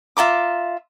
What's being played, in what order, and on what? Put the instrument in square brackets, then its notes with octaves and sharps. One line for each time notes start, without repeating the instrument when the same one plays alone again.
[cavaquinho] F4 E5 A#5 D6